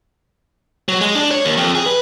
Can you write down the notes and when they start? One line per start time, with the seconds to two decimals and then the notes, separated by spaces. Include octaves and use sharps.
0.88 F#3
1.01 G#3
1.15 D4
1.31 C#5
1.45 D#2
1.58 F2
1.75 G#4
1.87 B4